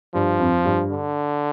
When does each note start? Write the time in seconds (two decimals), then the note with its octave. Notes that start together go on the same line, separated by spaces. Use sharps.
0.14 G2 F3
0.39 F2
0.65 G2
0.91 D3